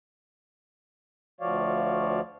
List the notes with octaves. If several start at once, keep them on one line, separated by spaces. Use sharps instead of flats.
D2 F3 F#4 C#5 D5 F5